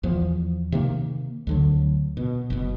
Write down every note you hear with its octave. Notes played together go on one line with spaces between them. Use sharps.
E2 F3
C3 D#3 A#3
D2 D3 F#3
B2
F#1 B2